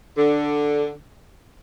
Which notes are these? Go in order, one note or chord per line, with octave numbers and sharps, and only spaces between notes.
D3